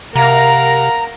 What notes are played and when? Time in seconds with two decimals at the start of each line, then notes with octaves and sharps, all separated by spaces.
0.15 C3 A#4 F5 F#5 A#5